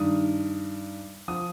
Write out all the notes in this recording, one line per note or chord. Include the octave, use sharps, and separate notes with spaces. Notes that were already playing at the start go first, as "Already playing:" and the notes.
Already playing: G2 D#3 D#6
F3 D#6